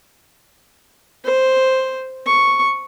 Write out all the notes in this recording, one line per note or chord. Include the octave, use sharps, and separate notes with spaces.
C5
C#6